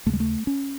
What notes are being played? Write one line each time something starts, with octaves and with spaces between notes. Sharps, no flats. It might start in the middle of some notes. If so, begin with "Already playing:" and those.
D#2 C#3 A3
G#3
A3
C#4